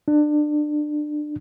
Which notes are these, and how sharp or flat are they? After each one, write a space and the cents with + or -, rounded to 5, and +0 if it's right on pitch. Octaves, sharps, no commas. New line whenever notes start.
D4 +25